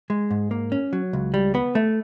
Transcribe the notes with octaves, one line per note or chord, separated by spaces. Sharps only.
G#3
G#2
A#3
C#4
F#3
C#2
G3
B3
A3